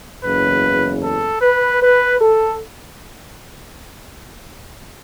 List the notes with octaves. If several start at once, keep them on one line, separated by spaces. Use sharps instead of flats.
F#1 E2 C#3 B4
A4
B4
B4
A4